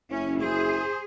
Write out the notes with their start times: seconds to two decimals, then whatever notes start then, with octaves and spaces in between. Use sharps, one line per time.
0.11 F#1 C#4 E4
0.42 G#4 C5